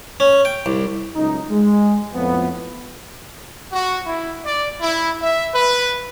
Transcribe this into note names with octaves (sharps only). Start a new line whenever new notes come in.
C#4
G5
C2
C#2 F#2 D#4
G#3
F2 A2 F3 B3
F#4
E4
D5
E4
E5
B4